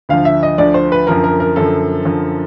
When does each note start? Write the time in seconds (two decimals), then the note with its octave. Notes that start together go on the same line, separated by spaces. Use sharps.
0.09 D2 D3 F3 F5
0.25 E5
0.43 D#5
0.58 D2 D3 F3 D5
0.74 C5
0.92 B4
1.07 F#2 D3 F3 A#4
1.24 A#4
1.40 A#4
1.56 F#2 D3 F3 A4
2.05 F#2 D3 F3